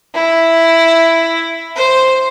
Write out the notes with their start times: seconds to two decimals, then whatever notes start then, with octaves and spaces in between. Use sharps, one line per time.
0.14 E4
1.76 C5